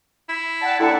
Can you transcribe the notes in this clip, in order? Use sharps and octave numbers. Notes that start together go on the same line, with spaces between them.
E4
D5 F#5 G5 A5
D#2 D4 E4 A4 D5 E5 F#5